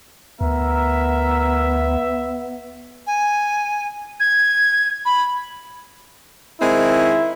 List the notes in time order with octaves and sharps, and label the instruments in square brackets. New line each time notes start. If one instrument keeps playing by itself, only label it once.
[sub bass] D2 [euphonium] B3 [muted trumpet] A#4 [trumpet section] E5
[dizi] G#5
G#6
B5
[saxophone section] D#3 G#3 C4 [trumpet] E4